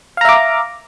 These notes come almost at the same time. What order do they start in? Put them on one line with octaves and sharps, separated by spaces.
F5 A#5 E5 D6